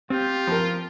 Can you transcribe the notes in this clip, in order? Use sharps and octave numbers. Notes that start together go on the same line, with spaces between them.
C4 F4 G4
F3 A#4